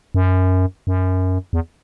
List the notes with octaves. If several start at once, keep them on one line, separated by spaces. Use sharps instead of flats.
F#2
F#2
E2